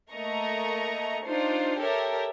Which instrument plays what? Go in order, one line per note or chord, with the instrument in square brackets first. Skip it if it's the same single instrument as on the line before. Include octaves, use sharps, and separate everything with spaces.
[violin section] A3 A#3 D#5 A#5 C#6
D4 D#4 F4 C5
G4 A4 A#4 C#5 E5